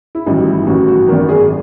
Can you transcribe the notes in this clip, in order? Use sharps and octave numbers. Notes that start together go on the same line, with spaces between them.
E4
A1 G2 D#3 F#3 D#4
E4
A1 G2 D#3 F#3 F#4
F#4
G#1 F#2 D#3 A#4
G#4